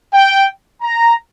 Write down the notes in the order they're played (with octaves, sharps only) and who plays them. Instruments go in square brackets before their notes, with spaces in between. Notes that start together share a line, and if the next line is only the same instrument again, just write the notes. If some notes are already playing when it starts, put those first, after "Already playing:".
[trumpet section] G5
A#5